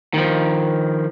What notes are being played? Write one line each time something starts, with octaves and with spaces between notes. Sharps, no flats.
D#3 F3